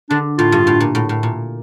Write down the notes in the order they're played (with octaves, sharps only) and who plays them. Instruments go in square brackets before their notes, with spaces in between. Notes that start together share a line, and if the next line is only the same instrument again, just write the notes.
[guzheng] D3 [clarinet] D4
[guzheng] A2 [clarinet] F4
[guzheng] G2
A2
A#2
A2
A2
A#2